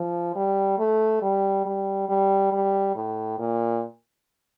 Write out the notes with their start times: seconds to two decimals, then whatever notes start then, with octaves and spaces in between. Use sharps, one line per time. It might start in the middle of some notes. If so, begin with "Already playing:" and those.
Already playing: F3
0.35 G3
0.79 A3
1.22 G3
1.65 G3
2.09 G3
2.52 G3
2.95 A2
3.39 A#2